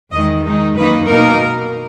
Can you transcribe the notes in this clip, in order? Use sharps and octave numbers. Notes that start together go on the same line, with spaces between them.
E2 D#3 G#3 D#5
D#3 G#3 D#4
F#2 D#3 A#3 D#4 B4
B2 A#3 D#4 A#4